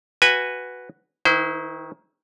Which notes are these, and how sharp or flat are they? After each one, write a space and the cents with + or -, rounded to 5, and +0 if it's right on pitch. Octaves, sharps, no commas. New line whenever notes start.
F#4 +0 B4 +0 G#5 -15
D#3 +15 E4 -20 C5 -35